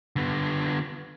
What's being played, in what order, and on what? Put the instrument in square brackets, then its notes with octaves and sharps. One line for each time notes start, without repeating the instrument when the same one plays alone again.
[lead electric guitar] D3 B3